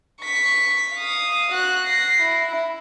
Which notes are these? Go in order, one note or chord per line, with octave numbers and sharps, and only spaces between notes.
C#6 B6
F5 D#6
F#4 F#6
A#6 C7
E4